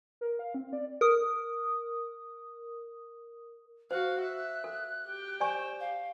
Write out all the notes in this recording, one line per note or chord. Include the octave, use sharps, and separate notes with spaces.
A#4
F5
C4
D5
A#4 D#6
F#4 C5 F5 F#6
E5
A4
G4 G5
C5 D5 G#5 C#6
F5